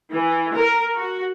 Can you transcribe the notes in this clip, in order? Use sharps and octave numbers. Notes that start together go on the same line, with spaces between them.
E3
A#4
F#4